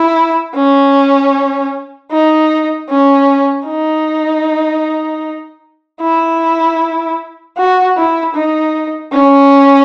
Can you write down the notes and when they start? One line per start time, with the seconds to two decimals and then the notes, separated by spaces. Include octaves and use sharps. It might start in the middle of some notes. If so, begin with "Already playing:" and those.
Already playing: E4
0.55 C#4
2.11 D#4
2.89 C#4
3.67 D#4
6.01 E4
7.57 F#4
7.96 E4
8.35 D#4
9.12 C#4